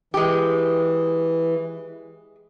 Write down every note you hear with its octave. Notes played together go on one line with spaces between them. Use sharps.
E3 G#3 G4